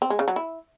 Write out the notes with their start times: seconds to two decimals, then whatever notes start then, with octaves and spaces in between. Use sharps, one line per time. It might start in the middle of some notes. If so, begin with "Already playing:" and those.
0.02 C4
0.10 G#3
0.19 C#3
0.28 F#3
0.36 E4